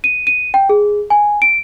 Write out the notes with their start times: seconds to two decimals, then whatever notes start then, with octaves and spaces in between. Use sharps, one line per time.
0.04 D#7
0.27 D#7
0.54 G5
0.69 G#4
1.10 G#5
1.42 D7